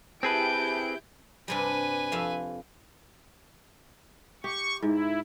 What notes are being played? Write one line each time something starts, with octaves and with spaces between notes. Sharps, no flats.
C4 E4 G4 G#4 B4 A5 G6 D7
G2 C3 G3 B4 G#5
F2 E5 F5
G4 C#6
G#2 E4